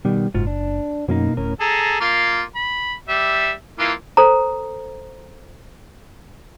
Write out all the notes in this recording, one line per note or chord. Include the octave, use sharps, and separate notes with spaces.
B2 D#3 G3
F#1 G#2 F4 F#4
D4
F#2 B2 A#3 D#4
D1 A2 C#4 A#4
G#4 A4 A#5
A#3 F4
B5
G3 E5
E3 A#3 F4
A4 C5 A#5